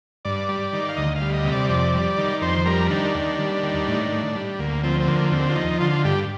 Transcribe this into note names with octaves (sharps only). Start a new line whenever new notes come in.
G2 D5
G3
D#3
F5
D2 D#5
F5
G3
D#5
C3
D5
F2 D5
G3
D#3
F2 C5
G3 A#4
D#3 D4
D#2
G3
D#3
A2
A2
G3
D2 A#3
F3 C4
C4
D3 A#3
D#2 C4
F4
F3 D#4
D3 F4
G2 G4